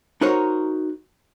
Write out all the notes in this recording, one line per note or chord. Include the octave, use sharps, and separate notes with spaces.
D#4 F#4 A#4 C5 C#5